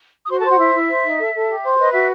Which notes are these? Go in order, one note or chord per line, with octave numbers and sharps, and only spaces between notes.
D#6
F#4 C5 C6
A4 A5
C5
F#4 F#5
E4 E5
E4
C5
D#4
A4
A4
G4
C5
B4 D#5
F#4 E5